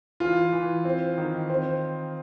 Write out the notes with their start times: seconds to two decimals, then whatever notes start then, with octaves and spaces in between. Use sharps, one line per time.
0.20 E3 F4
0.52 E3
0.85 C4
1.18 D#3
1.50 C4